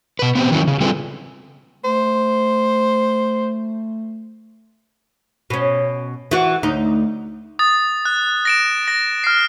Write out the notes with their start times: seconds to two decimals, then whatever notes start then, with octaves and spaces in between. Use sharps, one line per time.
0.19 B2 B4
0.35 B3 C4 G4
0.52 D#3 E3 F#3 A#3 C#4
0.68 C#3
0.80 G3 C4 F4 G#4 A4 B4
1.84 A3 C5
5.50 B2 C#4
6.31 E3 F#4
6.63 D2 D#4
7.59 D#6 A6
8.05 F#6
8.45 A#6 D7 E7
8.88 A#6
9.24 F6 C7